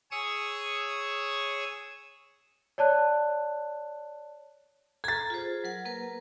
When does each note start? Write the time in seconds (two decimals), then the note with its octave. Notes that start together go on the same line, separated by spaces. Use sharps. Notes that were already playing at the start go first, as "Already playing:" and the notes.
0.11 G#4 C#5 C#6 D#6 E6
2.78 C#5 D5 A5 F#6
5.04 A4 A#5 G#6 A6
5.30 F4 G#4 C5
5.64 F#3 A#4 F#5
5.85 A#3 A#4 B4